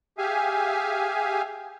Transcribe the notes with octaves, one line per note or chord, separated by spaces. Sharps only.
G4 G#4 E5 F5 G#5